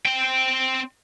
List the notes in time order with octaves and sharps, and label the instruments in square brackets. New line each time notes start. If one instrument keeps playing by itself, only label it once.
[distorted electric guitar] C4 G5